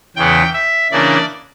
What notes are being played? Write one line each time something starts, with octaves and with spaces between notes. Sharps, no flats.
E2 C#3 E3 B3 G5
E5
C#3 E3 A#3 D4 D5